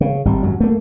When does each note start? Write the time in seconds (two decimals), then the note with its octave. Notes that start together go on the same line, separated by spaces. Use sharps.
0.01 C#3
0.25 G#1 G3
0.43 F#2 F#3
0.60 A3 A#3